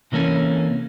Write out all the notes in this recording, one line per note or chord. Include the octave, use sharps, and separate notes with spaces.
C3 E3 A#3 C#4 A4